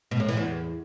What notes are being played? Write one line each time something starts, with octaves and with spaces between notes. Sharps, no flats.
B2
A2
E3
E2